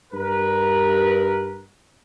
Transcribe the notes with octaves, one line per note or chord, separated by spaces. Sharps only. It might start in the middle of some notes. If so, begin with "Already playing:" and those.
G2 A#4 B4